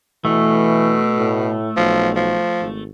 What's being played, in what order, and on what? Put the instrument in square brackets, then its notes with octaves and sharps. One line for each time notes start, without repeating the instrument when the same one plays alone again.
[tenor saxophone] B2 [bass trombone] E3 [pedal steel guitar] A3
[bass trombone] A2
[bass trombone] B1 [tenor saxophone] F3
[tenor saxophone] F3
[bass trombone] G#1